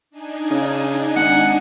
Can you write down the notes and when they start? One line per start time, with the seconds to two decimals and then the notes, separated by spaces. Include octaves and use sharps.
0.10 D4 D#4 G#5
0.51 C#3
1.16 G#1 F#5